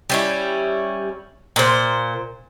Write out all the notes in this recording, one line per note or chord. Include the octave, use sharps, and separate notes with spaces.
G3 C#4 E4
A#2 C5